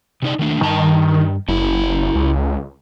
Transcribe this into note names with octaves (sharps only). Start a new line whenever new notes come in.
C3 D#4 D5
D#3 A3 D4
G2 D#3 A5
F#1 C#4 E4
C#2